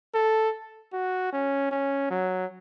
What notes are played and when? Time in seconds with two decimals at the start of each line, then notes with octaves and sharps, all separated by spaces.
0.14 A4
0.93 F#4
1.33 C#4
1.71 C#4
2.10 F#3